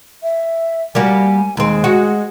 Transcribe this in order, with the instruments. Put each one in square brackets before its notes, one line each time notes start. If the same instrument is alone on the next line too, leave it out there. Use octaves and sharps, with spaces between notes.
[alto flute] E5
[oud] G3 A#3 F#4 [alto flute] G#5
[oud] D#2 C4 [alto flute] G#3
[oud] F#4